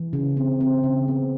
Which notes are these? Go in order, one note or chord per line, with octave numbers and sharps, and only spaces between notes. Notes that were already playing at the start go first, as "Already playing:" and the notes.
Already playing: E3
C#3
C4
C4
C#3
B3